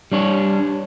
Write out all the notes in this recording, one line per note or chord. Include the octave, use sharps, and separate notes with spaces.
G3 D4 C#5